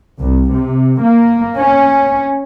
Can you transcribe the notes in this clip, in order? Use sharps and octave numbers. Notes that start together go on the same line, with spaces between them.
C2
C3
A#3
C#4